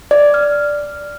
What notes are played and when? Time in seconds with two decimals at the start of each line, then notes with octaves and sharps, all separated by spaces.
0.11 D5
0.34 F6